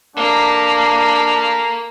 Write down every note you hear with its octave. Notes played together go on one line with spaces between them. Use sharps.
A3 A#3 D4 F5 A#5